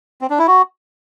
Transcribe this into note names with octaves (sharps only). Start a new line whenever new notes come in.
C4
D4
E4
F#4